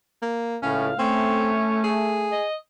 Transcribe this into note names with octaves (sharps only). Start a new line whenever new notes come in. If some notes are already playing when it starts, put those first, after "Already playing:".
A#3
C#2 A2 C#4 F5
A3 C4 C#4
G#4
D#5